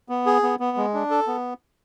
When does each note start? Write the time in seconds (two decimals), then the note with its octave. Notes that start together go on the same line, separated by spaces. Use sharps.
0.09 B3
0.26 G#4
0.43 B3
0.60 B3
0.77 G#3
0.94 D4
1.10 A4
1.27 B3